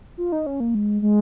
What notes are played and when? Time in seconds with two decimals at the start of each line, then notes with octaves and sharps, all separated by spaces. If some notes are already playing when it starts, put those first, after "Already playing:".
0.18 F4
0.32 D#4
0.46 C#4
0.60 A#3
0.75 G#3
1.02 G#3